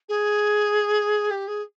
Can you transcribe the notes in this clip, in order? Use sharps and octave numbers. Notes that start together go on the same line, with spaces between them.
G#4
G4
G#4